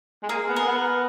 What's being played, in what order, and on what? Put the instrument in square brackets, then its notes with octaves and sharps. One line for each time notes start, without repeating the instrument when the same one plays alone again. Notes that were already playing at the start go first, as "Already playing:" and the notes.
[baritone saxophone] G#3
[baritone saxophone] A#3 [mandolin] G#4
[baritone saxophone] B3
[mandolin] A#4
[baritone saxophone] B3